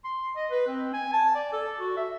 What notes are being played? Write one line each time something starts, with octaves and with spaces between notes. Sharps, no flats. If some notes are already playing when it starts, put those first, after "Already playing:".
C6
D#5
B4
C4
G#5
A5
D5
A4
F#4
E5